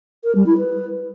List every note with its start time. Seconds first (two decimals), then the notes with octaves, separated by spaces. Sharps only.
0.23 A#4
0.35 G3
0.46 E4
0.57 B4